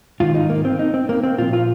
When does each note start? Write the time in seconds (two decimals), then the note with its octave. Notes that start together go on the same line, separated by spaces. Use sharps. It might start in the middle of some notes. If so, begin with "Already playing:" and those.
0.20 G#2 D#3 F4
0.35 D#4
0.50 A#3
0.65 C4
0.79 D#4
0.94 C4
1.09 A#3
1.23 C4
1.38 A#2 F3 F4
1.53 F4